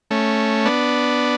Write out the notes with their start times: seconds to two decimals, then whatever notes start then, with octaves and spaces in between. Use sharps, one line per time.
0.11 A3 C#4
0.65 B3 D4